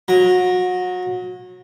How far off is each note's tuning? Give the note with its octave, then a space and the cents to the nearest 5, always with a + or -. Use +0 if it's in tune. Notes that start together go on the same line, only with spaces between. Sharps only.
F#3 -30 A#5 +0